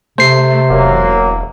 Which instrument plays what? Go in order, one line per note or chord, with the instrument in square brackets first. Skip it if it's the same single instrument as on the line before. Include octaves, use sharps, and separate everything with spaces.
[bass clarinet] C3 [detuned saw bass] A3 [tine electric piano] C5 C7
[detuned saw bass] E1 [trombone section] F#3 A#3